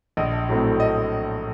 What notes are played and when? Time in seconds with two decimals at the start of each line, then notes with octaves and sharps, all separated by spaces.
0.17 A#1 D#5
0.48 A2 F#3 A3 C4
0.80 D#5